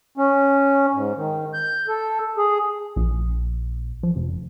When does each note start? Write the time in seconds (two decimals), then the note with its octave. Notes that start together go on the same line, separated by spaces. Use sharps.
0.18 C#4
0.94 G#2
1.16 D#3
1.54 G6
1.88 A4
2.38 G#4
2.96 A#1
4.03 F3
4.16 F1